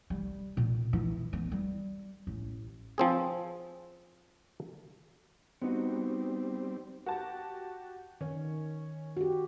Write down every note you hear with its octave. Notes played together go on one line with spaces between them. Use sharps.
G3
A#2
E3
B3
G3
A1
F3 C4 G#4
G3 B3 C4 D#4 F#4
F#4 G4 A5
D#3 C#4
F#4 G4